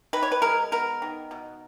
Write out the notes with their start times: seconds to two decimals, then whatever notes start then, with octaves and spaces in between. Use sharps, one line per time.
0.13 D#3 B4
0.23 C#5
0.32 B4
0.42 G#3 A#4
0.72 B3 A#4
1.02 D#3
1.31 B2